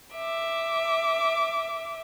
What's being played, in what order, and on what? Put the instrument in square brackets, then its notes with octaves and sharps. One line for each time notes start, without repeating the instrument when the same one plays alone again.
[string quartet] E5 D6